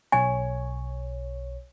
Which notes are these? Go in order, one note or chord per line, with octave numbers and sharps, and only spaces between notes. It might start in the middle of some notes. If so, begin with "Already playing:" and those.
B1 C#5 G#5